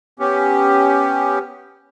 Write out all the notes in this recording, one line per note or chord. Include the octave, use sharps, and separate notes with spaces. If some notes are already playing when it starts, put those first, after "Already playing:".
B3 C#4 G4